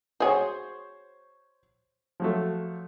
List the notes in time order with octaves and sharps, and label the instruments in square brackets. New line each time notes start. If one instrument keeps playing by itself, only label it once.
[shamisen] F#4 G#4 [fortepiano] C5 C#5
[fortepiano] F3 F#3 A3